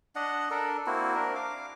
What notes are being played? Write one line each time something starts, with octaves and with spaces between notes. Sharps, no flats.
D4 D#5 F#5
D4 A4 A#4
A#3 C4 E4 F#4
D4 A#4
F5 D6